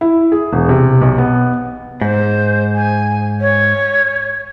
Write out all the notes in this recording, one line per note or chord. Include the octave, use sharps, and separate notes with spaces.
E4
G#4
E1
C3
B1
B3
G#2 C5
G#5
C#5